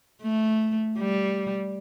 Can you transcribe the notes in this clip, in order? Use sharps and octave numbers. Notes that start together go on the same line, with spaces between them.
A3
G3